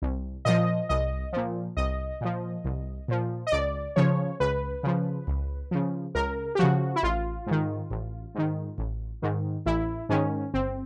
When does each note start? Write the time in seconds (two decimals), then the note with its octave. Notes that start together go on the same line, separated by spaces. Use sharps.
0.02 C2
0.45 A#2 F3 D#5
0.89 C2 D#5
1.33 A#2 F3
1.77 C2 D#5
2.21 A#2 F3
2.65 C2
3.08 A#2 F3
3.47 D#5
3.52 C#2 D5
3.96 C#3 F3 C#5
4.40 C#2 B4
4.83 C#3 F3
5.27 C#2
5.71 C#3 F3
6.15 C#2 A#4
6.55 G4
6.59 C#3 F3 F#4
6.96 E4
7.03 A1 F4
7.47 G#2 D#3
7.91 A1
8.35 G#2 D#3
8.78 A1
9.22 G#2 D#3
9.66 A1 E4
10.09 G#2 D#3 C#4
10.54 G1 C4